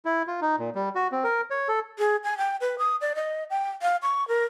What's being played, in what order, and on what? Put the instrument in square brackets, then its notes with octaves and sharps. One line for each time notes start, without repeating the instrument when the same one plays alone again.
[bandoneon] E4
F4
D#4
A#2
G3
F#4
C4
A#4
C#5
A4
[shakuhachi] G#4
G#5
G5
B4
D#6
D5
D#5
G5
F5
C#6
A#4